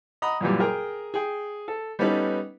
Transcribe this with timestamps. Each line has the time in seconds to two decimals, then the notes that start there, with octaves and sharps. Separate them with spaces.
0.22 D#5 F#5 A#5 B5 D#6
0.41 F#2 A#2 E3 G3
0.59 G#4 A#4 G5 A#5
1.14 G#4 G5
1.68 A4
1.99 G3 B3 C#4 D#4 A4 B4